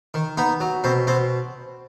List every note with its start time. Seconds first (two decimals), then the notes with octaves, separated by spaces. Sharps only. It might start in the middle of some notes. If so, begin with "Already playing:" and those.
0.14 D#3
0.38 B3 D#4
0.60 F#3
0.84 B2 C4
1.07 B2 C4